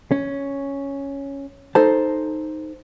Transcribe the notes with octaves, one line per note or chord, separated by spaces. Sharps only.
C#4
D#4 A4 C5 A5